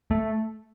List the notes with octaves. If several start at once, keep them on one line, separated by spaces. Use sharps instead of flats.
A3